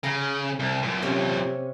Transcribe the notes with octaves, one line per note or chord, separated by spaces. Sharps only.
C#3 A#5
C2
F#2 A#2
C3 C#4 C#5